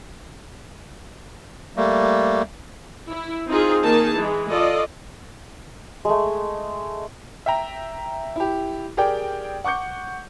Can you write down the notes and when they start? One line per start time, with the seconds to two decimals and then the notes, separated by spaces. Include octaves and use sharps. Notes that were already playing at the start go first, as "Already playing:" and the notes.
1.76 G3 A3 A#3
3.10 E4
3.49 C4 D#4 F4 G#4
3.85 D#3 A#3 D#4 G#4 A5
4.15 E3 G#3
4.48 F4 A4 D5 D#5
6.05 G#3 A3
7.46 E5 G5 A#5
8.36 E4 G4
8.97 G4 G#4 A#4 D5 G5
9.64 F#5 C#6 D6 G6 C#7